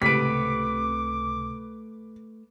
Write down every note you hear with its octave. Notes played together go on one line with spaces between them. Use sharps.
C#2 A2 C3 A3 B4 D6 B6 D7